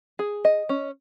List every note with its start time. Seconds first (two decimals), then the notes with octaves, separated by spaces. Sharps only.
0.19 G#4
0.45 D#5
0.69 C#4